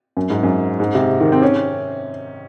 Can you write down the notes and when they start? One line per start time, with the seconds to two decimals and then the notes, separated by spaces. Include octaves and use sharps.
0.17 F#2
0.30 G#2
0.43 F#2
0.80 G#2
0.95 C3
1.21 D#3
1.32 C4
1.42 C#4